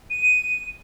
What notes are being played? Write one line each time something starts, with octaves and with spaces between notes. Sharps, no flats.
D#7